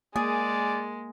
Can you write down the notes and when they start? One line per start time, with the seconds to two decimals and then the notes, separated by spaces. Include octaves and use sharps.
0.16 G#3 A#3 G#4 D5